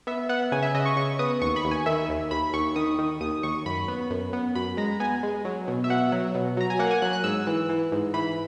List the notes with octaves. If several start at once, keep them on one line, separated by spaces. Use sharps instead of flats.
B3 E5
B3 F#5
C#3 G#5
E5
C#3 D#5
C#6
C#3 C#6
B3 D#6
D#2 C#6
B5
D#2
G#5
D#3 E5
D#2
D#2 B5
D#2 C#6
D#3 D#6
D#3
D#2 D#6
D#2 C#6
F#2 B5
B3
F#2
B3
F#2 B5
G#3 A#5
B3 G#5
G#3
F#3
B2
E5
B2 F#5
F#3
B2
F#3 A#5
G#5
A#3 F#5
G#5
F#3 F#6
F#6
G#2 E6
E3
E3
G#2
E3 B5